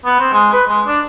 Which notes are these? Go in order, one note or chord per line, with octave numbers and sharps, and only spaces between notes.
B3
C4
G#3
B4
G#3
D4